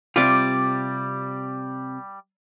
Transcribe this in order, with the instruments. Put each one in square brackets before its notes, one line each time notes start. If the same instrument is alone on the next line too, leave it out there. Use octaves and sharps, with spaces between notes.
[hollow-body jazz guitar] C3 F4 [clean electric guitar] G3 D5